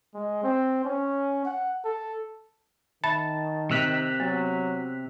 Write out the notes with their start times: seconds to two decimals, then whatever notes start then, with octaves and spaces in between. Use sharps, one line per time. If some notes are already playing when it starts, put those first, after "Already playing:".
0.14 G#3
0.44 C4
0.84 C#4
1.45 F#5
1.84 A4
3.04 D#3 E5 A5 B5
3.71 C3 E6 F#6 B6
4.20 F#3 B3